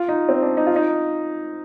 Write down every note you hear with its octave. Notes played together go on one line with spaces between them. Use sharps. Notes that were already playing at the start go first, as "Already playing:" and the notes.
Already playing: F4
D#4
C4
D4
D#4
F4
D#4